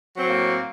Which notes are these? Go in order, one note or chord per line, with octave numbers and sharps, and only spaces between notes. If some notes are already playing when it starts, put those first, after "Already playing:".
A2 F#3 A#3 C4